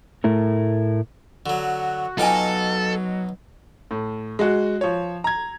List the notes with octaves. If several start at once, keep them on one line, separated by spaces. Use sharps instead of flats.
A2 A3 E4 A#4
D3 F#3 F#4
B2 F#3 D#4 F4 A4 G5 G#5 D6
A2
G#3 F#4
F3 C#5
A#5 G#6